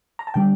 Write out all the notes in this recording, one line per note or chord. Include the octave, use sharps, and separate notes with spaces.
A#5
A5
D3 G3 D4 G5